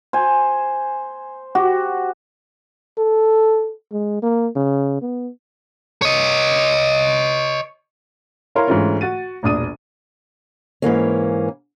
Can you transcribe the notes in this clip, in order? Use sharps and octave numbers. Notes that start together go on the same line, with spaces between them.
C5 G#5
F#4 G4
A4
G#3
A#3
C#3
B3
C#5 D#5
E4 A#4 C#5 F5 A#5 C6
G#2 D3 E3 A3 C#4 F4
F#4 A6 D#7
E1 A#1 D4 D#6 D#7
G#2 E3 A#3 C#4